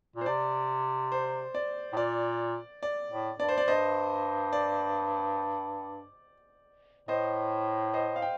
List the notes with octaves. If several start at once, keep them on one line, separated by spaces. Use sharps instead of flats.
A#2
C5
C3 D5
C5
D5
A2
A#2 D5
D5
A2
G2 D5
C5
D5
G2 C5 D#5
D5
A2 C5 D#5
C5 D#5
F5
G5